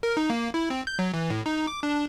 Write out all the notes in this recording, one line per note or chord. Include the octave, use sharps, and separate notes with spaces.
A#4
D#4
A#3
E4
C4
G6
F#3
E3
A2
D#4
D6
D4